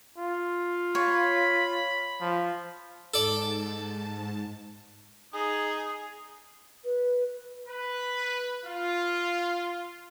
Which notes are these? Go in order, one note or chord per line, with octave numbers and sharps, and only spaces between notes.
F4
C#5 B5
F3
G#2 A4 D5 A5
D#4 G#4
B4
B4
F4